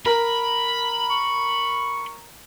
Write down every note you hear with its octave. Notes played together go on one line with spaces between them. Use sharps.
A#4 B5
C#6